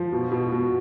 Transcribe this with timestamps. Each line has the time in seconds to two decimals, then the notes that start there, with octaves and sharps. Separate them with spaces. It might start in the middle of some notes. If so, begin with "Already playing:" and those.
Already playing: F3
0.12 B2
0.31 B2
0.52 B2